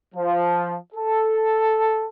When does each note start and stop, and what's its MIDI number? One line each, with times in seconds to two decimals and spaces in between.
0.15 0.75 53
0.95 2.07 69